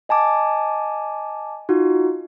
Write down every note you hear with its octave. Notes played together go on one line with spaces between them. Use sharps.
D#5 G#5 A5 D6
D#4 F4 F#4